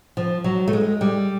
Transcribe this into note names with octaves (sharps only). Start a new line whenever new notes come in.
F3
F#3
A3
G#3
G3